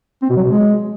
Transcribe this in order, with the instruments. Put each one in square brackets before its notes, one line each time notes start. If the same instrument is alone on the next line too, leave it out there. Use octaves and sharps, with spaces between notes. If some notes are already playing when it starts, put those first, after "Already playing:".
[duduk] C4
B2
F#3
B2
G#3